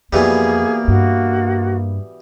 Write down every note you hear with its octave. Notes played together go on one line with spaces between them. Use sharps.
F2 B2 E3 G3 A#3 G#4
G2 F#4